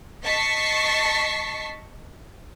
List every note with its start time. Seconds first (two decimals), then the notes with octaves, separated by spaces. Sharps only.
0.23 D#5 A5 C#6 B6 C7